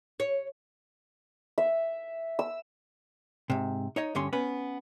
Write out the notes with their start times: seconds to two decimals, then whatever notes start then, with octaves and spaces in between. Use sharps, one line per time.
0.20 C#5
1.58 E5
2.39 E6
3.50 G#2 C3
3.96 D#4 C#5 D#5
4.15 G2 D3 C#4 C6
4.33 B3 C#4 B4